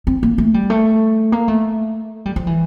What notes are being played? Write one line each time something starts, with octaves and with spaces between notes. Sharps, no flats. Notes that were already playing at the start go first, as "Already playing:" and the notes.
C4
A#3
A3
G3
A3
A#3
A3
G3
F3
E3